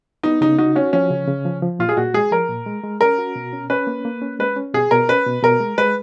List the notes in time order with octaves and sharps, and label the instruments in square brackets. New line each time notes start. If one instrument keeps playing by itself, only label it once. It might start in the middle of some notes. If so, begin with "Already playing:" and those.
[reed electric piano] B3 [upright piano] D#4
[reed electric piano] C#3 [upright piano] D#4
[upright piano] D#4 [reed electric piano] F#4
[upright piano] C#4 [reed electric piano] F#4
[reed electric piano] F3 [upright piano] C#4
[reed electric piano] C#3
C#3
F3
F3
[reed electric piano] A#2 [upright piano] F4
[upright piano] G#4
[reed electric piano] A#2 [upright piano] F#4
[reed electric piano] G#3 [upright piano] G#4
[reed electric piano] F3 [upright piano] A#4
[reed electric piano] A#2
G#3
G#3
[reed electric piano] C#4 [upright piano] A#4
[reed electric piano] F#4
B2
C#4
[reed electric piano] C#4 [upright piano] B4
[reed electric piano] A#3
A#3
C#4
[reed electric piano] G#3 [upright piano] B4
[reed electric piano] C#4
[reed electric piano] B2 [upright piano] G#4
[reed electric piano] B2 [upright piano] A#4
[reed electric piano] C#4 [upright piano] B4
[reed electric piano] B2
[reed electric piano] B2 [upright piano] A#4
[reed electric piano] G#3
[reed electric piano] G#3 [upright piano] B4